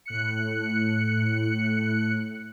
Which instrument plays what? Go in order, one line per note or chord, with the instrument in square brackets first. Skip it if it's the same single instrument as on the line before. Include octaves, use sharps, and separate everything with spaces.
[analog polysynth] A2 F#6 C#7